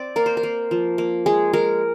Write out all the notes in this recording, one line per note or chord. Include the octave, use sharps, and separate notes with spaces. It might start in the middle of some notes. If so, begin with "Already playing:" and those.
Already playing: C4 D5
A#3 A#4
C5
A#4
A#3
F3
A#3
G#3 G#4
G#3 A#4